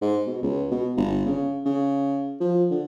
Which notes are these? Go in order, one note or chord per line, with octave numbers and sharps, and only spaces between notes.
G#2
B2
C#2
B2
G1
C#3
C#3
F3
D3